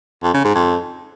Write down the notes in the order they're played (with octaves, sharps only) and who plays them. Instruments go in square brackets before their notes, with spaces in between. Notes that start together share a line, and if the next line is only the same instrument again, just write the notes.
[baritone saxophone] F2
C#3
G#2
F2